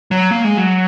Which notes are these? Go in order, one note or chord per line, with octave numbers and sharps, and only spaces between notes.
F#3
A#3
G#3
F#3